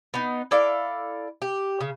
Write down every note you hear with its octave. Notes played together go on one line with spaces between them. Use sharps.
B3 D#4
E4 A4 D5 F5
G4
C#3